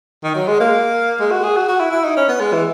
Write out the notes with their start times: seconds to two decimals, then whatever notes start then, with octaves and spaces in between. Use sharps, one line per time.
0.23 D#3
0.35 F#3
0.47 G#3
0.60 A#3
1.20 G#3
1.31 F#4
1.43 G#4
1.56 F#4
1.68 F#4
1.80 E4
1.91 E4
2.04 D#4
2.17 C#4
2.28 B3
2.41 G#3
2.53 E3